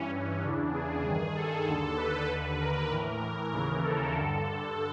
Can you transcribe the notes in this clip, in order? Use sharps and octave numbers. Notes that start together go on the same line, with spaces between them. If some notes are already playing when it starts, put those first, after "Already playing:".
Already playing: G2 E3 C#4
C#4
E2 C#3 E3 D4
G#4
G2 D#3
A4
D#2 D3
B4
D#2 D3
A#4
A2 E3
D#2 C#3 E3
A4
G2 D3 A4